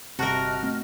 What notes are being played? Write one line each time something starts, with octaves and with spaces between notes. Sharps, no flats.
G1 C3 F#4 A#4 D#5 A5 F6 F#6
A3 C4